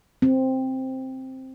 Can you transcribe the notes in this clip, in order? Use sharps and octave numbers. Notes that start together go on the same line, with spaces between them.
C4